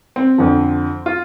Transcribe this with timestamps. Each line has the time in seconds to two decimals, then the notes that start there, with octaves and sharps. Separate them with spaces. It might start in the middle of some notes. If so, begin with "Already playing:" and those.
0.16 C4
0.38 F2 D3 F3
1.06 F4